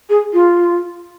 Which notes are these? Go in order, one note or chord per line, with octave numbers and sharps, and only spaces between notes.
G#4
F4